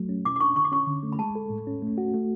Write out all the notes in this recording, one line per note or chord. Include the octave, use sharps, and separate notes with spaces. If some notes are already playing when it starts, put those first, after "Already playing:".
Already playing: F#3 A3
C#4
B2 D6
D6
D4 C#6
D3 C#6
D6
C#4 C#6
D3
A3
B5
G#3 A5
A4
A2
C#4
A3
F#4
A3